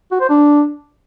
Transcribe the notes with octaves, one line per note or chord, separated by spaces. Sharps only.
F#4
C5
D4